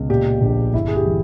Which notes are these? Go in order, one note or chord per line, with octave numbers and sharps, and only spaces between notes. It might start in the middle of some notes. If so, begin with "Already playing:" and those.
Already playing: C#2 B2
A#2 G4
A#1
G1 E4
G#4
G4
E3